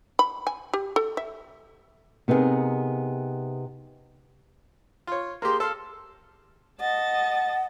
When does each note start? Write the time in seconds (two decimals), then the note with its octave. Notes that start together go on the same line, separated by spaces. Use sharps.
0.19 B5
0.47 G#5
0.74 G4
0.96 A4
1.17 E5
2.28 C3 B3 D#4 E4 G#4 A#4
5.07 F4 C#5
5.42 A#3 G4 G#4 C6
5.60 A4 F5 C6 F6
6.81 D#5 F#5 A5 A6